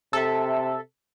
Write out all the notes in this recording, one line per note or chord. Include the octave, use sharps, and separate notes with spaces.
C3 A4 E5